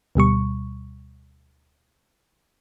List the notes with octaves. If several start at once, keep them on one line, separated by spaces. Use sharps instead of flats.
D2 B2 G3 C#6